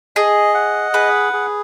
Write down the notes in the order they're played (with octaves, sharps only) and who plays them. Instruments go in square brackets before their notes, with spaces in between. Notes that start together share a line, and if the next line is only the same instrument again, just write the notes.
[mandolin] G#4 [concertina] D#5
[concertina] F#5
[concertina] G#4 [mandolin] B4
[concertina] G#4